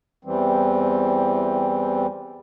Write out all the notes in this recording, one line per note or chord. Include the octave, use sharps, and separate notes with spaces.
E2 E3 G3 C4